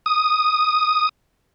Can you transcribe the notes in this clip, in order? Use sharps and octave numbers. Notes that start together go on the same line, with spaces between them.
D#6